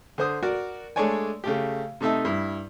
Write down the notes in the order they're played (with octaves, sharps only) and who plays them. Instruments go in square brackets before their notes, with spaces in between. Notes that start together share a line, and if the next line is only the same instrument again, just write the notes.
[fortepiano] D3 C5 D#6
F#4 A#4 D5
G#3 A3 D4 C#5 D5 G#5
C#3 A3 G4
C3 A3 D#4 E5 A5
G2 E4